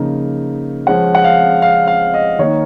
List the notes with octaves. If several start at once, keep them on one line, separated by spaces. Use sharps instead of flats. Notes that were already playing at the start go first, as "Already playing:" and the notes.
Already playing: C#3 F3 A#3 D#4
F3 G#3 C#4 F#5
F#5
F5
F5
F5
D#5
D#3 A#3 D#4 C#5